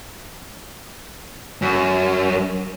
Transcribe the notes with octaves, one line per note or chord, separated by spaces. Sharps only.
F#2